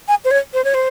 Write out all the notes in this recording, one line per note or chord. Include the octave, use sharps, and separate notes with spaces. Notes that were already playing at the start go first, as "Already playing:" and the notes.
G#5
C5
C#5
C5
C#5
C5